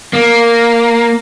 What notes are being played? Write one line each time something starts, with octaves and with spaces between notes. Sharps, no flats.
A#3